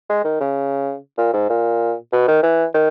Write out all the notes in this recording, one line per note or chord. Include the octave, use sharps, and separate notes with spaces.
G#3
D#3
C#3
A#2
G#2
A#2
B2
D#3
E3
D#3